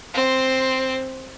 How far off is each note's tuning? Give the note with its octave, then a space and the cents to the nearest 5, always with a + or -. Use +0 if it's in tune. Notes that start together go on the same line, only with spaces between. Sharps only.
C4 +0 C6 +0